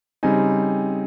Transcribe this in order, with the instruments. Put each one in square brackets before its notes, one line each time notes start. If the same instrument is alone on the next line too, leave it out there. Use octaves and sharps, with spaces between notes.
[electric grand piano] C#3 G3 C4 D#4 G#5